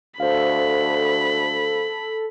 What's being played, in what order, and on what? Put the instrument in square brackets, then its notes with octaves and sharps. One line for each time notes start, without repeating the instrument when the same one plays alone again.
[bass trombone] D2 [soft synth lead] A4 [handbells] C5 F5 [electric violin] B5